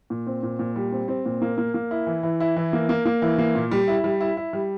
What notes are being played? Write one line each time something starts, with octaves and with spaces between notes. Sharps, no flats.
A#2
C4
A#2
A#2
G3
C4
C4
A#2
A#3
A#3
A#3
E4
E3
E3
E4
E3
A#3
A#3
A#3
E3
A#3
A#2
G3
E4
G3
E4
E4
G3